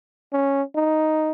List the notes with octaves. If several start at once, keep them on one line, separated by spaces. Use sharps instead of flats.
C#4
D#4